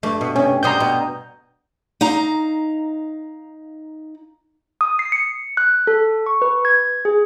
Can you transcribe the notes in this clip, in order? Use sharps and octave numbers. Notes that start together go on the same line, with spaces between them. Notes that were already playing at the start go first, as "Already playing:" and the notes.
G2 A3
B2
C3 C#4
B2 G3 A#5 C6 D#6 G6
B2
D#4 F5 A#5
D#6
C7
C#7
F#6
A4
C#6
B4
G#6
G#4